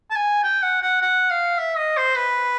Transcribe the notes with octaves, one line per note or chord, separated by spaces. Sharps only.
A5
G#5
G5
F#5
F#5
F#5
F5
E5
D#5
C5
B4